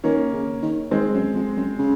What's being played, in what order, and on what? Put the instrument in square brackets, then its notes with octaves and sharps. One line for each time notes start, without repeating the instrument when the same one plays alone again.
[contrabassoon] D#3 [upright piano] A#3 C#4
[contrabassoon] C#3
D#3
[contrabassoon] D#3 [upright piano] G#3 C4
[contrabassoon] F#2
F2
F#2
C#3